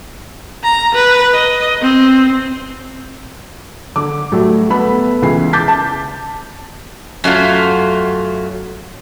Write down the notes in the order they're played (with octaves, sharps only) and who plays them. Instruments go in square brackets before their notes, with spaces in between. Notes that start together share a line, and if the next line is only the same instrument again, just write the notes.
[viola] A#5
B4
D#5
C4
[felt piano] D3 D6
A2 F#3 G3 A3
A3 B3 A4 B5
C#2 C#3 E3 C7
D6 G6 A6 B6
A5
[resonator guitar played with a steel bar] F#2 F#3 A3 F4